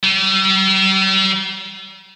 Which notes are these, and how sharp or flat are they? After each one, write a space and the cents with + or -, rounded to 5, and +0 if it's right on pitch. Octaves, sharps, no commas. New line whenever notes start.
G3 -40